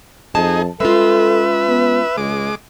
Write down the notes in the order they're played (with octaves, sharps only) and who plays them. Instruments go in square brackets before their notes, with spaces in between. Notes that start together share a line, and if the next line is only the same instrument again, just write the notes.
[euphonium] F2 [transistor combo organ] D#4 G#4 [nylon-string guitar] A5
[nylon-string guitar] G#3 C#4 F4 [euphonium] A4 [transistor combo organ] B4 E5
[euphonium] B3
[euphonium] C#2 [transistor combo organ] G#3 D6